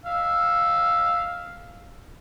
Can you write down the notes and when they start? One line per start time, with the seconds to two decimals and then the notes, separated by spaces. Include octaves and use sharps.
0.05 F5 E6